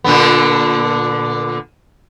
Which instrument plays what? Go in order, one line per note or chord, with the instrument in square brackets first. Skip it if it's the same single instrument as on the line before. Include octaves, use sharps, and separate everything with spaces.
[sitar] A#2 D3 B3